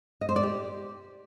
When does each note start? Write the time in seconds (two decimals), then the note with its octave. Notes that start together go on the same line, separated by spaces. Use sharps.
0.21 D#5
0.29 C5
0.36 D5
0.43 G4